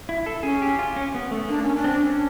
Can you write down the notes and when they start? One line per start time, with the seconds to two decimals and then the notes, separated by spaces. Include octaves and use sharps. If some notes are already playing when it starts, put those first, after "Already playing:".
0.09 E4
0.26 A4
0.43 C#4 G#4
0.62 G4
0.79 F4
0.96 C#4
1.15 B3
1.31 A3
1.49 A#3 D4
1.63 C#4
1.77 D4
1.84 C4
2.02 C#4